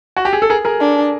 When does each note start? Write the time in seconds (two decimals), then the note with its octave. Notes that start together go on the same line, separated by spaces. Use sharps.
0.17 F#4
0.25 G4
0.33 G#4
0.42 A4
0.50 G#4 A#4
0.65 G#4 A#4
0.80 D4